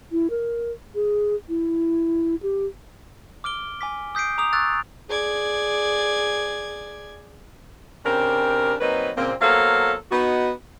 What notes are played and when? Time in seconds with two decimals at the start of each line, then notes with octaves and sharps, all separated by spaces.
0.12 E4
0.30 A#4
0.95 G#4
1.49 E4
2.43 G4
3.44 D6 F6 D7 G7
3.81 G#5 D6 B6
4.15 D#6 G6 B6 C7 D7
4.38 A#5 D6 D#6 F7
4.53 C#6 E6 F#6 A6
5.09 G#4 D5 G#6
8.05 C#3 C4 D4 G4 A#4
8.81 F#3 A#3 C4 D#4 B4
9.17 A#2 C#3 A#3 C4
9.41 F#3 A#3 B3 A4 C5 F5
10.12 B3 D#4 F#4